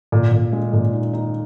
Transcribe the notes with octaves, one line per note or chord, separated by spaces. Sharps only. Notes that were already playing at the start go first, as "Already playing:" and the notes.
A#2
A#2
G#3
A#2
D#4
D#4